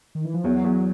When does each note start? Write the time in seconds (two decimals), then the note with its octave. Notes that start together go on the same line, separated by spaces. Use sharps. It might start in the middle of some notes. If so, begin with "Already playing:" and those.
0.15 D#3
0.25 E3
0.34 F3
0.44 E2 F#3
0.64 E2